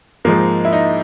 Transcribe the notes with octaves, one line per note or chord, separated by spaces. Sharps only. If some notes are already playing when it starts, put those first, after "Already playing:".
G#2 F3 G#3 A#3
E4
D#4